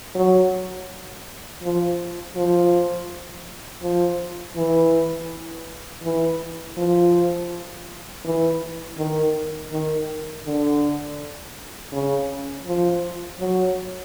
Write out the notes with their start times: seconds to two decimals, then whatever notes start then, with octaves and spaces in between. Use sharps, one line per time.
0.15 F#3
1.62 F3
2.36 F3
3.83 F3
4.57 E3
6.04 E3
6.77 F3
8.25 E3
8.98 D#3
9.72 D#3
10.45 D3
11.93 C#3
12.66 F3
13.40 F#3